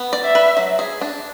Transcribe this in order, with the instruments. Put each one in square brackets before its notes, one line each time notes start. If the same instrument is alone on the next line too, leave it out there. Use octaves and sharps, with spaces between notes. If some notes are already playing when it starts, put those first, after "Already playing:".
Already playing: [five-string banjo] B3
D5
[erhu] E5
[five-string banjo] B4
F#3
G#4
D4